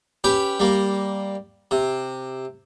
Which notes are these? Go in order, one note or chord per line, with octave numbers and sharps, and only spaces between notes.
C#4 G4 B4
G3 A#3
C3